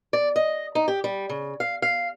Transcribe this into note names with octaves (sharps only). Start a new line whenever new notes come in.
D5
D#5
D#4
G4
G3
C#3
F5
F5